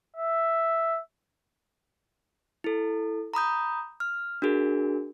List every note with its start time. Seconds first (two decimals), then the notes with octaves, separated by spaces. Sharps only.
0.16 E5
2.64 E4 A4
3.34 A#5 B5 D#6 G6
4.00 F6
4.42 D4 F#4 G#4 A#4